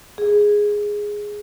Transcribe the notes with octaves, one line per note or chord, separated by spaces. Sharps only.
G#4